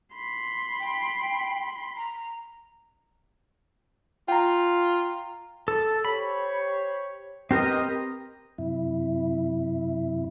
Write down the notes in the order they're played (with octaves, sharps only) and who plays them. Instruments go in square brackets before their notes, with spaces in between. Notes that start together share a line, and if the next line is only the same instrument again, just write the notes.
[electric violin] B5 C6
[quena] G5
A#5
[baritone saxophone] F4 [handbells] G5 A#5
[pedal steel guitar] A4
[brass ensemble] G4 C5 C#5 [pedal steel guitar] B5
[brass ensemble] B3 B4 D#5 [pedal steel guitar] C4 G4 A#4
[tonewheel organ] F#2 C3 E4